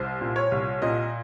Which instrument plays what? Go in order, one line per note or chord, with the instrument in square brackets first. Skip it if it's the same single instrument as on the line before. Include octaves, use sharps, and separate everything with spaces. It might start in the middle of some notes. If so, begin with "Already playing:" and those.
Already playing: [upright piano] C2 C5
A#2
C#5
C2
A#2 D#5